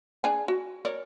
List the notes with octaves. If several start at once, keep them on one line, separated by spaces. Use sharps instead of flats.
D4 G#4 G#5
F#4
A#4 C#5 D5